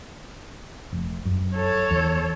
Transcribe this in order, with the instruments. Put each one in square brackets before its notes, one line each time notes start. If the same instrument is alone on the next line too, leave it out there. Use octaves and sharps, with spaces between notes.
[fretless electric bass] F1
F#2
[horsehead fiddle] A4 C#5
[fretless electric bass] E2